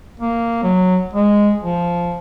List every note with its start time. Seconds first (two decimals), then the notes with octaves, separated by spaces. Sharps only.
0.20 A#3
0.63 F#3
1.13 G#3
1.61 F3